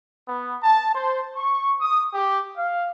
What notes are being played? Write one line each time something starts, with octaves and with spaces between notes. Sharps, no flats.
B3
A5
C5
C#6
D#6
G4
F5